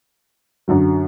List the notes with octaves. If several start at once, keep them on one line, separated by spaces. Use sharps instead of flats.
F#2 D3 F#3